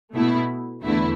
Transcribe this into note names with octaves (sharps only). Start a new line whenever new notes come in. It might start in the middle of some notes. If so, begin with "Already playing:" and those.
B2 A3 E4
E2 D3 A3 E4